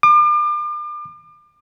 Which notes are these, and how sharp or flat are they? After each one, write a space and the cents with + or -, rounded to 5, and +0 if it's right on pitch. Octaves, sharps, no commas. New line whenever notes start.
D6 +40